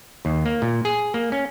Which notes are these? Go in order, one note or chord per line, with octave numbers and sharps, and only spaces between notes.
D#2
A#3
A#2
G#4
A#3
C#4